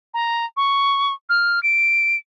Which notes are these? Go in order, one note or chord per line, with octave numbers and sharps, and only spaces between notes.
A#5
C#6
F6
D7